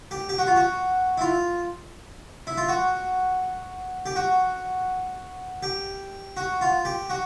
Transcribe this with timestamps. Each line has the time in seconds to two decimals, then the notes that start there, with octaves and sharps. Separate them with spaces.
0.11 G4
0.29 G4
0.38 F#4
0.47 F4
0.56 F#4
1.18 E4
1.21 F4
2.47 E4
2.57 F4
2.69 F#4
4.06 G4
4.16 F#4
5.63 G4
6.37 F#4
6.61 F4
6.85 G4
7.10 F#4